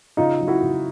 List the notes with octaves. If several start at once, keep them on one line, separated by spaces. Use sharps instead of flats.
C#3 D#4 F4
F#3
E4 F#4
C#3